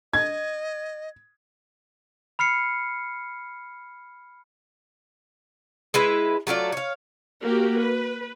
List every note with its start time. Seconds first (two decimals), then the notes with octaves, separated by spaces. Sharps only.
0.13 D#5 G#6
2.39 B5 F6 C7 C#7
5.94 G#3 E4 B4
6.47 F#3 A3 F4 D5
6.72 C#5 F5
7.42 A#3 F#4 G4
7.79 B4